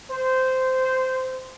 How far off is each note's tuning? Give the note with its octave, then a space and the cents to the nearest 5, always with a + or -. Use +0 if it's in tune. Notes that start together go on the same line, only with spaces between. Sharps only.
C5 -15